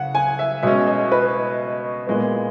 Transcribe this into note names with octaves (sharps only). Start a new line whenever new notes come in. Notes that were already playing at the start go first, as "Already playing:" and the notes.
Already playing: C#3 F#5
G#5
E5
B2 G#3 C#4 E5
D#5
B4
A#2 G#3 B3